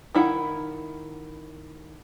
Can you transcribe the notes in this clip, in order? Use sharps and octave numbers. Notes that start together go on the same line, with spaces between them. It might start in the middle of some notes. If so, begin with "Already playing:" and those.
D#3 E4 F#5